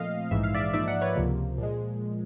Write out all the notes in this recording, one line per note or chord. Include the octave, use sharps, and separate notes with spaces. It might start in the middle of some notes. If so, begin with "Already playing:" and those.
Already playing: A#2 F3 A3 C4 D#5 F5
A#1 G#2 E3 E5
F5
D5 E5
G#2 F3 A#3 D#4 D5 E5
E5 F#5
B4 C#5
C#2 C3 F3 A#3
A#2 F3 G#3